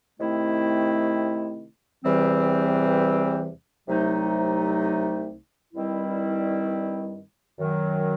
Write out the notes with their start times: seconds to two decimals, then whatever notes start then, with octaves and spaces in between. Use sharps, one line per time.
0.18 C3 D#3 A3 C4 E4
2.03 E2 C3 E3 G3 C4
3.87 C2 C3 F#3 A3 D#4
5.72 G2 D#3 G3 C4 E4
7.58 F#2 D#3 F#3